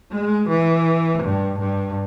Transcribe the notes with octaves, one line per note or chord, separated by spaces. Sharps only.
G#3
E3
G2
G2